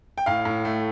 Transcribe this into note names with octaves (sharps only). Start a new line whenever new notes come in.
G5
A2 F5
A2
A3